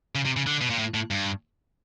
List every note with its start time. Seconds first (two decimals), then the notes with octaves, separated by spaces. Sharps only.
0.15 C#3
0.25 C3
0.37 C#3
0.47 D3
0.61 B2
0.70 A#2
0.79 A2
0.94 A2
1.11 G2